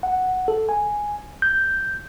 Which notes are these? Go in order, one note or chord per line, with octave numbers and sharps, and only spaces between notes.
F#5
A4
G#5
G6